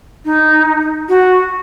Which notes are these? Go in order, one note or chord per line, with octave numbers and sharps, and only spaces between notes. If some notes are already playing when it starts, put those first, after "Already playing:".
D#4
F#4